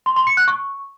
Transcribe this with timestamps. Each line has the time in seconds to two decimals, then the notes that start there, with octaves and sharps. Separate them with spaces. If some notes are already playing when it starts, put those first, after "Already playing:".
0.06 C6
0.16 C6
0.27 C#7
0.37 F#6
0.48 C#6